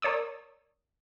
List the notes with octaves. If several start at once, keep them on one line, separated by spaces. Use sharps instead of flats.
A#4 C#5 D5 D#6 E6